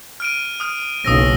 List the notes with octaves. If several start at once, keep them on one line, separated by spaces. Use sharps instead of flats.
F6 D7 D#7
D#6 F6
F#1 B1 C#3 D#6 E6 A#6